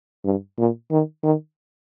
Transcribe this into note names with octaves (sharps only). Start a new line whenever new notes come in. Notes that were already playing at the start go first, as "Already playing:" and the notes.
G2
A#2
D#3
D#3